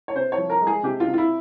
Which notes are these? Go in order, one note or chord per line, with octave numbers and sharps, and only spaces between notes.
C#5
C3 C5
C#5
F3
A#4
G#3
G#4
C3 G4
F4
C3
F4
E4